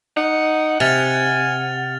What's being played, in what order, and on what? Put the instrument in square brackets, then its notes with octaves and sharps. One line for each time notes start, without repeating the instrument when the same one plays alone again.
[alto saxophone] D#4 [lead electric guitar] F#5
[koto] C3 [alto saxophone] G#5 [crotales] F6 A6 F7